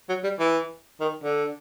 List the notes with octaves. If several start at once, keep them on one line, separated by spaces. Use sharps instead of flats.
F#3
G3
E3
D#3
D3